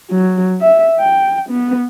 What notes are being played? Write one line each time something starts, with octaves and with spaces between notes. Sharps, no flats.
F#3
E5
G5
B3